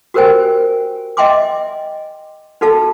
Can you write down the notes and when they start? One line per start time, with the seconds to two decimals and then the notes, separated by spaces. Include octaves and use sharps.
0.14 F#4 G4 A#4 C5 G5 G#5
1.17 D#5 E5 G5 G#5 C6 D6
2.61 D#4 F#4 A4 F5 A5